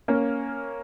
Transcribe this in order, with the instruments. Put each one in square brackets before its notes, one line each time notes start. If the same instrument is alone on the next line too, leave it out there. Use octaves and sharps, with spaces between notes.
[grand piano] A#3 C#4